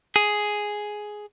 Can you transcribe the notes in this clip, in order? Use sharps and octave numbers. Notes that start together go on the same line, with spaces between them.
G#4